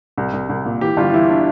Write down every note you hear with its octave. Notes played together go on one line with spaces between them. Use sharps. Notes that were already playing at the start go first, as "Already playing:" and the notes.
C2
C2
C2
A#2
E3 G4
G1 F4
F4
E3 E4
D4